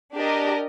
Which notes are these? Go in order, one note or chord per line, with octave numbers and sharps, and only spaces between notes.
D4 G4 A#4 D#5